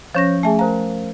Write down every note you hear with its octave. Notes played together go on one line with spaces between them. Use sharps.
F3 C#4 C5 C#5 G6 A#6
A3 G#4 E5 G#5 A5
A#4 C5 F5 A#5